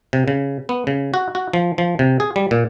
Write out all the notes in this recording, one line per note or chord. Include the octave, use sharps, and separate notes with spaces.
C3
C#3
B3
C#3
F#4
F#4
F3
F3
C3
G#4
G3
A#2